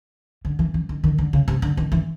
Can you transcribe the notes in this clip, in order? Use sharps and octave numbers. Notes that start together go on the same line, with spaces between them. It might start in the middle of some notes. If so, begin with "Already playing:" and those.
D3
E3
E3
D#3
D#3
D3
C#3
C3
D3
D#3
E3